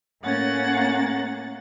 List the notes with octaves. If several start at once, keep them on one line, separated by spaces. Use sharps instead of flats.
A2 A#3 C#4 F#5 A6 A#6